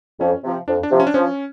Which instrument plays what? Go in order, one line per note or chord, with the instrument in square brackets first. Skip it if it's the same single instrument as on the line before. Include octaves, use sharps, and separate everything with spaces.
[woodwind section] F2 [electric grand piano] C#4
[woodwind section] C3 F3
[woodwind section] F2 [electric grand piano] D4
[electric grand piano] D4
[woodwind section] C3 F3
[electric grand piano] C#4
D4
[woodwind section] F3 [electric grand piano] C#4